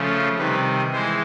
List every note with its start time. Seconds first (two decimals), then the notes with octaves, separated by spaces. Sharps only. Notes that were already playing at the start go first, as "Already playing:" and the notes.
Already playing: C#3 F3 A3
0.38 C3 D#3 G3 B4
0.93 E3 G#3 C5